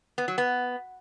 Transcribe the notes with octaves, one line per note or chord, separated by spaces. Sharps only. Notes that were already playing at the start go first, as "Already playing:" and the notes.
B3
F#3
B3